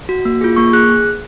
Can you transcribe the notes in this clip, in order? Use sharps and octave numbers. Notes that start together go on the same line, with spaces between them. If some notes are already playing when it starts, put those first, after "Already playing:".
F#4
A#3
F4 G#4
A#3 C#6
G#4 F#6